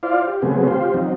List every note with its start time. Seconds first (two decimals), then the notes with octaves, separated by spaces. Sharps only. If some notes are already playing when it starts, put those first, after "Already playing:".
0.03 E4 F4 C5 D5 F5
0.27 G4
0.42 C#3 F#3 A3 B3 C4 G#4
0.68 F4 G4 C5
0.94 F3 F#3 C4 D#4